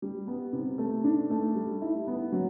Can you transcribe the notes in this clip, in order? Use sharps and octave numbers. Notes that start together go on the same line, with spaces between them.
G3
B3
C3
A3
D4
A3
G3
E4
B3
F#3